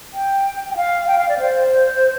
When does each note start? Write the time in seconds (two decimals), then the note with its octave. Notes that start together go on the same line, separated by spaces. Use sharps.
0.14 G5
0.71 G5
0.77 F5
1.08 G5
1.18 F5
1.29 D5
1.39 C5